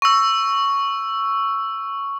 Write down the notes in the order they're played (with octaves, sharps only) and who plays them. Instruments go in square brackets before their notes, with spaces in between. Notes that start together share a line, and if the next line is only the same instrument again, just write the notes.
[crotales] C#6 E6